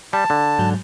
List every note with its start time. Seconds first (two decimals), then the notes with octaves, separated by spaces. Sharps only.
0.13 G3 A5
0.30 D3
0.59 G#2 F#3